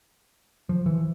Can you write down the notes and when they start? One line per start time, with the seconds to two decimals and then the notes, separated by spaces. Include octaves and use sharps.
0.69 F3
0.86 E3